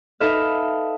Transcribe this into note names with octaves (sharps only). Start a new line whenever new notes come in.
D#4 A4 B4 E5 F5